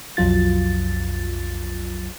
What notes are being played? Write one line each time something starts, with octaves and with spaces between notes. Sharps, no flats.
B1 F2 F#3 F4 A6